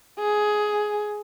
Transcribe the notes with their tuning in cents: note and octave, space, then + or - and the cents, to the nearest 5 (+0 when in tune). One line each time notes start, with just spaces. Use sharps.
G#4 +10